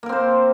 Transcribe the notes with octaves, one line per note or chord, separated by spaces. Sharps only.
A#3 C4 A#4 C5